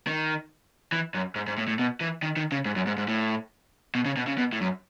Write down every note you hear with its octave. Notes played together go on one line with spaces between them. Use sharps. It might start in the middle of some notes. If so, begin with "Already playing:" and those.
D#3
E3
F#2
G#2
G#2
A2
A2
B2
E3
D#3
D#3
C#3
G#2
F#2
G#2
G#2
A2
B2
C#3
B2
C#3
B2
A2
F#2